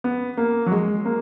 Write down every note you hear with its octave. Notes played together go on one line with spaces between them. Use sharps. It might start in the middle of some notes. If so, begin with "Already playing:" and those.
B3
A#3
F#3
G#3
A#3